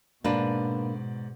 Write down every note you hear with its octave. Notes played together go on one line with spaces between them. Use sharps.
G#2 B2 A#3 D4 B4 D5